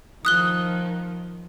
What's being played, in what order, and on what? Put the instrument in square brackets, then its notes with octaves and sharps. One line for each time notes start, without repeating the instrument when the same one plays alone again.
[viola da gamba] D#3 F3 [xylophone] D#6 F#6 G7